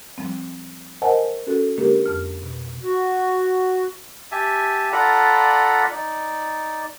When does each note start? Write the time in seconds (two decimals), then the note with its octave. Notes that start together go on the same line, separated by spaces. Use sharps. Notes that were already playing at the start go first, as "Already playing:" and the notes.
0.18 F3 G3 C4
1.02 A#4 C5 D#5 F#5 G#5 A5
1.47 C#4 F#4 A4
1.78 D3 G#3 A#3 D4 G4 A#4
2.06 F2 F6
2.43 B2
2.83 F#4
4.32 G4 E5 G#5 A5
4.92 F4 A4 D5 F#5 A#5 B5
5.92 D#4 D5